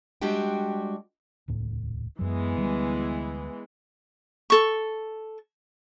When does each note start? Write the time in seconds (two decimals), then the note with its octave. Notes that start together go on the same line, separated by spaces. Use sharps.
0.22 G3 G#3 D4 F#4 G4 G5
1.48 D#1 C#2 A2
2.19 F#2 E3 F#3 G#3 B3
2.57 D2 G3
4.50 A4 C#6